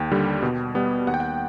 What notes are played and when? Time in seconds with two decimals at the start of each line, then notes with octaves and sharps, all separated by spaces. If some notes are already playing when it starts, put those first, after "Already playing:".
Already playing: D#2 G5
0.11 D3 G3
0.42 B2
0.75 G3 B3
1.07 D#2 F#5
1.14 G5
1.20 F#5